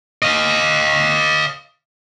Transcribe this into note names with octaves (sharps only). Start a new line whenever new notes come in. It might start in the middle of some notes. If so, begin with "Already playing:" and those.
D#5 F5